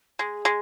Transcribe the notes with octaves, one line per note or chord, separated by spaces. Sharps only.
G#3 G#4
G#3